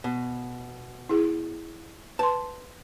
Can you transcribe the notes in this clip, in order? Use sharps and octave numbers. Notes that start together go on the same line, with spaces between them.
B2
E4 G#4
B4 A5 C6